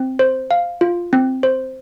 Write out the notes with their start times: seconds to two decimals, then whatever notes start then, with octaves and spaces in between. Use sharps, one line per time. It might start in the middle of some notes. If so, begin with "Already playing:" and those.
Already playing: C4
0.19 C5
0.51 F5
0.81 F4
1.13 C4
1.43 C5